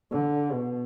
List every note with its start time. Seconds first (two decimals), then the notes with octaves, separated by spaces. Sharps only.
0.11 D3
0.53 B2